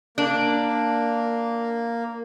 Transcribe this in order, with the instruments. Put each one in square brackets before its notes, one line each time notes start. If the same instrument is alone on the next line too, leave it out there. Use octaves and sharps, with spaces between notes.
[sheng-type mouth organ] A#3 [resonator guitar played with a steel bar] D4